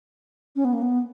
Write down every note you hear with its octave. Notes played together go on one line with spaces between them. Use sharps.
C#4
B3
A#3
B3